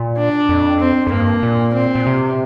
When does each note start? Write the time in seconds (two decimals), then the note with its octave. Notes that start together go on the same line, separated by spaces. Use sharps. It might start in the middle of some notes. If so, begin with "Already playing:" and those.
Already playing: A#2
0.17 D4
0.49 F2
0.80 C4
1.07 F2
1.12 G2 A#3
1.43 A#2
1.74 C4
1.95 A#2
2.07 C3